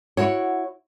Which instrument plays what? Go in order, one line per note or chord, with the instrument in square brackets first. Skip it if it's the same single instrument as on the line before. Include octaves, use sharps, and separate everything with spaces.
[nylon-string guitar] E4 F#4 C#5